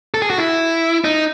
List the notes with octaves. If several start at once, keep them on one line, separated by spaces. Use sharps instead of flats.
A4
G#4
F#4
E4
D#4